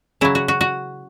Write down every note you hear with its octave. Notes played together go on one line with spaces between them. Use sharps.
C#3 F#3 E4
F#4
F#4
F#4